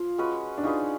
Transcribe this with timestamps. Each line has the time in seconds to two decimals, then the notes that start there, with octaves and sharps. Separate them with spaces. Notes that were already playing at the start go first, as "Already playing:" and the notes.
Already playing: F3 F4
0.18 G#3 C#4 F#4 B4
0.58 D4
0.63 C#4 D#4 F4 G#4 B4